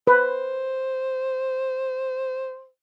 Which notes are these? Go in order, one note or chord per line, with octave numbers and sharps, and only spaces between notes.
B4 C5